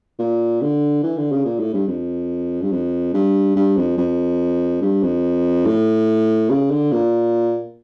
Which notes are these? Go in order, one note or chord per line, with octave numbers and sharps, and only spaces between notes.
A#2
D3
E3
D3
C#3
A#2
A2
G2
F2
G2
F2
G2
G2
F2
F2
G2
F2
A2
C#3
D3
A#2